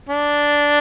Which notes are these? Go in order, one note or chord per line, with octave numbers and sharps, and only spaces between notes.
D4